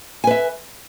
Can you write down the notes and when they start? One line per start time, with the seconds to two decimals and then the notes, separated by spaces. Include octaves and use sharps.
0.24 G#5
0.27 B4
0.31 E5